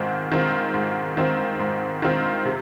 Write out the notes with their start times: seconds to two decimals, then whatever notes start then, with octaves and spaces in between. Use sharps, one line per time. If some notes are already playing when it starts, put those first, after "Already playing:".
Already playing: G#2 D#3 C4 F4
0.32 D#3 C4 F4
0.74 G#2
1.17 D#3 C4 F4
1.59 G#2
2.02 D#3 C4 F4
2.45 C3